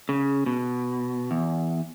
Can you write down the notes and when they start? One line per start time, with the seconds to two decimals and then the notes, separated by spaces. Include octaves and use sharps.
0.09 C#3
0.46 B2
1.31 E2